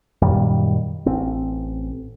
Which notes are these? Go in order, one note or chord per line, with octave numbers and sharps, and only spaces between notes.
F#2 A#2 D#3 G3
A1 C4